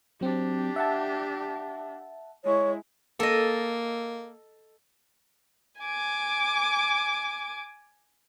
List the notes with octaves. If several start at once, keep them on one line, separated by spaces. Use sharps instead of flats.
F#3 C4 D4 G4
E5 F#5 A5
G#3 E4 C#5
A#3 A4 D#5
G#5 D6